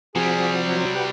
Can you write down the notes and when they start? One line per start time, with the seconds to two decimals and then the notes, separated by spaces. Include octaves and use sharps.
0.15 C3 F3 G3 C4 F#4 G#4
0.67 F#3
0.95 F#4 G4 B4